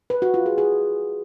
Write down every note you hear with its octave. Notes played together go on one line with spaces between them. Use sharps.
B4
F#4
F4
G#4
G#4